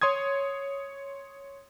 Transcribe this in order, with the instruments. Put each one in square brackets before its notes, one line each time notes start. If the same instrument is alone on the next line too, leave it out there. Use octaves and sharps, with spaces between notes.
[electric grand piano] C#5 C6 D#6 G#6